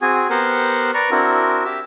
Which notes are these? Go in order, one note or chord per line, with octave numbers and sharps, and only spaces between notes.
C4 F#4 G#4 G#5
B3 G4 A#4 C5 F#5
B4 D5 A#5 C#6
C4 D4 E4 F#4 A#4
G4 E5 E6